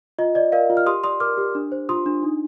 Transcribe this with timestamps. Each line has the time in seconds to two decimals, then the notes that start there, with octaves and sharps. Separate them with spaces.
0.19 F4 D#5
0.35 D5 D#5
0.52 A#4 D5 F5
0.70 F4
0.77 F6
0.86 G4 C6 D#6
1.04 D5 C6 D#6
1.20 A#4 D6 F6
1.37 G4
1.55 D4
1.72 C5
1.89 F4 C6 D#6
2.06 D4
2.23 D#4